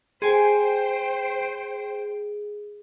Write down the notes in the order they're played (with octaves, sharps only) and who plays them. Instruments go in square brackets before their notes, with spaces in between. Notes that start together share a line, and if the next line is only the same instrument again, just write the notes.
[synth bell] G#4 [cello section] C5 [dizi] G5 [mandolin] G#5 C6